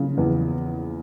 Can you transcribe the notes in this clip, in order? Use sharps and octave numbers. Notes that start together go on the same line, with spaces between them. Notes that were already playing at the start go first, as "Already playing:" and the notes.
Already playing: C#3 F3
E2